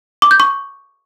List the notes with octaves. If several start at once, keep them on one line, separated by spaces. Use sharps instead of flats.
D6
G6
C#6